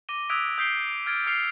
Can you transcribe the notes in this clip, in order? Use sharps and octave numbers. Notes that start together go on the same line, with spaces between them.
D6 A#6 D#7 G7
D#6 E6 F#6 G#6 B6 D7
D#6 G6 B6 C7 D7 G7
D7
F6 G#6 A6 D7
D#6 F6 G6 C7 C#7 F7